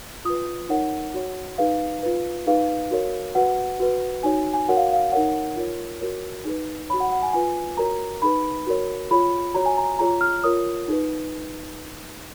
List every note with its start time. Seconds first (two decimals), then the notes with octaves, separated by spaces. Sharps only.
0.25 F4 B4 D#6
0.69 D#4 A#4 C#5 F#5
1.14 F#4 C#5
1.58 D#4 G#4 B4 F5
2.03 F4 B4
2.46 D#4 G#4 B4 F5
2.91 F#4 A#4 C#5
3.35 F#4 B4 F#5
3.79 F#4 B4
4.23 D#4 F#4 C#5 G#5
4.54 G#5
4.68 F#4 A#4 C#5 F#5
4.77 F5
4.93 F5
5.12 D#4 A#4 C#5 F#5
5.56 F4 A#4 C#5
6.01 F#4 A#4 C#5
6.45 D#4 G#4 B4
6.90 C#5 B5
6.93 F#4
7.00 F#5
7.12 F#5
7.23 G#5
7.33 F4 B4 G#5
7.77 F#4 A#4 C#5 A#5
8.22 D#4 G#4 B4 B5
8.67 F#4 A#4 C#5
9.11 F4 G#4 C#5 B5
9.54 F#4 C#5 A#5
9.66 G#5
9.78 A#5
9.99 F4 G#4 C#5 A#5
10.21 F6
10.44 F4 A#4 C#5 D#6
10.88 D#4 G#4 B4